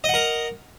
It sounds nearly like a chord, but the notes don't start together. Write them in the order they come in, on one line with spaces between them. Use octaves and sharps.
D#5 F#5 A#4